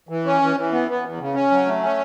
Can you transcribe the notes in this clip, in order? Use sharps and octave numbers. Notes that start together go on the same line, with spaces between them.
E3
C#4
E3
E3
B3
B3
E2
C#3
C#4
F#3
A3
C#4